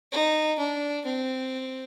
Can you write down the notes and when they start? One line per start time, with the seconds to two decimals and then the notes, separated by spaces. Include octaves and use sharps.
0.12 D#4
0.59 D4
1.06 C4